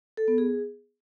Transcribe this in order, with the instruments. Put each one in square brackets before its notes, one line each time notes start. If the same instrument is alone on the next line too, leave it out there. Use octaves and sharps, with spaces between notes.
[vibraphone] A4
B3
G#4